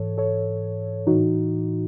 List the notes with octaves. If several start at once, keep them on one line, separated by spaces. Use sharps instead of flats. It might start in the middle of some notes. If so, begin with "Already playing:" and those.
Already playing: G#2 E3 A4 C#5
A4 C#5
A2 E3 D#4 F#4